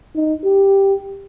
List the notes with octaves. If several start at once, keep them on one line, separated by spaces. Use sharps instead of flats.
D#4
G4